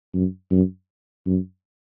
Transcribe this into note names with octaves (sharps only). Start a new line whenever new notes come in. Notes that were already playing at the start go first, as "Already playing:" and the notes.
F#2
F#2
F#2